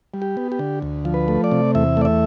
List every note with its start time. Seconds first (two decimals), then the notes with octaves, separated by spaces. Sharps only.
0.14 G3
0.22 G4
0.37 B3
0.52 G4
0.59 D3
0.82 D2
1.05 F3
1.14 B4
1.28 A3
1.44 D5
1.52 C3
1.75 E2 E5
1.97 A3 D5
2.05 E5